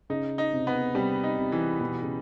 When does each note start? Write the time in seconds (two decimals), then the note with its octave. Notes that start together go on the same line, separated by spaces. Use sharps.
0.10 C#3 D#4
0.38 D#4
0.53 C3
0.67 B3
0.95 C3 G3
1.23 D#4
1.38 C3
1.52 E3
1.80 B2 E3
2.02 C#3